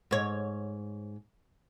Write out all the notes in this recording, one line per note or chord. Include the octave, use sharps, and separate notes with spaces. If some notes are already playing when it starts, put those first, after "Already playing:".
G#2 C#5